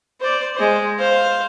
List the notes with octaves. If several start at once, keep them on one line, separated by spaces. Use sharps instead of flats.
C5 D5
G#3 C5
C5 F5